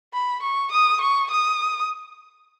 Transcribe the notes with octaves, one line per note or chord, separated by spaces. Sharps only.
B5
C#6
D#6
C#6
D#6